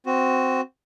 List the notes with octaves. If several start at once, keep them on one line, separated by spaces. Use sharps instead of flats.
C4 F#4